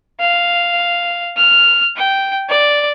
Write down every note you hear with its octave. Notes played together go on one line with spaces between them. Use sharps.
F5
F6
G5
D5